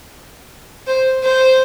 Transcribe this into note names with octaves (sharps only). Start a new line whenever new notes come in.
C5
C5